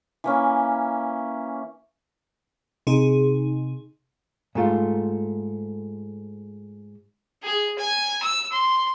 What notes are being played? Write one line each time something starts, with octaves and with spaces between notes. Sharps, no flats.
E3 A#3 C#4
C3 D#4 G#4
G#2 A3 F4
G#4
G#5
E6
C6